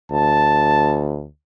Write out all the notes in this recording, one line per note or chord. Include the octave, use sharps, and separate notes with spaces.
D2 A5